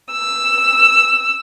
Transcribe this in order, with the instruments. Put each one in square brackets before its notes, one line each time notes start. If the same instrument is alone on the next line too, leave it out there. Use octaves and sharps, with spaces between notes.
[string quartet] E6